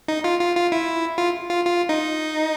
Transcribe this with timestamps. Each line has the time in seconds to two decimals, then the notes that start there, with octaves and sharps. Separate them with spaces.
0.08 D#4
0.24 F4
0.41 F4
0.56 F4
0.72 E4
1.18 F4
1.49 F4
1.65 F4
1.89 D#4